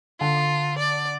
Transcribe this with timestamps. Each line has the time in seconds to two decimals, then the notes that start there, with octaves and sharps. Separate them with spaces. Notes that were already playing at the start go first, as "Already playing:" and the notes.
0.20 D3 F4
0.78 D5